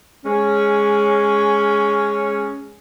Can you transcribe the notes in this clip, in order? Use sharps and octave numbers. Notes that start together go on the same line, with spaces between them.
G#3 C#4